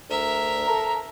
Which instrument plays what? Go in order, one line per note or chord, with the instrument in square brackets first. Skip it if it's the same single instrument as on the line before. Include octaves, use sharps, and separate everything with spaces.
[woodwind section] D2 [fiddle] A#4 E5
[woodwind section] A4 A#5